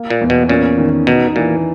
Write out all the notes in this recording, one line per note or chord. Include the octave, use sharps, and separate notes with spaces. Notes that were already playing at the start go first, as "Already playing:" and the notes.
Already playing: A#3
A#2
E2
B2
A#2 C#4
D#3
B2 D#4
A#2 E3